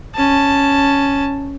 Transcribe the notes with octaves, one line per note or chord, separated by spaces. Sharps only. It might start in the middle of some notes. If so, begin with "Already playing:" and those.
C#4 A5